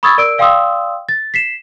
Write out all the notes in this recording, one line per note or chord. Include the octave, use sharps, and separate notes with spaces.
B5 C#6 D#6 E6 G#6 A6
A#4 D5 E6 D7
D5 F5 G5 C6 D#6 E6
A6
B6 C7 E7